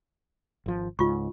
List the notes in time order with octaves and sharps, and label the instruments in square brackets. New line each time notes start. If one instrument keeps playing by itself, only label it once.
[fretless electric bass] G#1 F3
[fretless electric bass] C#2 G#2 [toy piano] F4 C#6